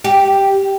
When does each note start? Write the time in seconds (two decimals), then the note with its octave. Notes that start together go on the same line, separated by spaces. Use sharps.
0.04 G4